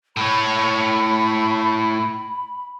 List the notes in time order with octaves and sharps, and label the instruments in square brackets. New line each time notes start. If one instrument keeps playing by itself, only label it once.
[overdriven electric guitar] A2 C#5 [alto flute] B5